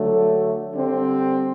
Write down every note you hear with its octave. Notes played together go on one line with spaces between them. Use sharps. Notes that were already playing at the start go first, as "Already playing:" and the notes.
Already playing: D3 F#3 A3
D3 G3 C4